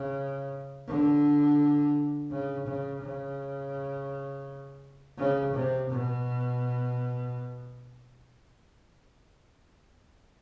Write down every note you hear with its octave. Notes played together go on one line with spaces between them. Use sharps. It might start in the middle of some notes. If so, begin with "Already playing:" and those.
Already playing: C#3
D3
C#3
C#3
C#3
C#3
C3
B2